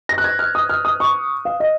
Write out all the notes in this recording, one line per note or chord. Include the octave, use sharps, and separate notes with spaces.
A#6
F#6
G#6
F6
D#6
F6
D#6
C#6
F5
D#5